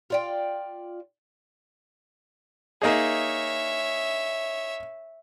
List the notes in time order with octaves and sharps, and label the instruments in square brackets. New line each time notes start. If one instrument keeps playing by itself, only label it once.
[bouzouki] F4 D5 G5
[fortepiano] A#3 D#4 G#4 [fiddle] C#5 E5